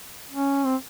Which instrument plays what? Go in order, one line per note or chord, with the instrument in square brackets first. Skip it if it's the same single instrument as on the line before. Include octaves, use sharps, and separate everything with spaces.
[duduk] C#4
C4